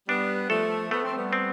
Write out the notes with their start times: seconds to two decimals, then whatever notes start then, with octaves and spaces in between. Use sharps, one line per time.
0.09 G3 B3 D4
0.50 F3 A3 A4
0.91 A3 B3
1.04 C4
1.16 G3 B3
1.33 C4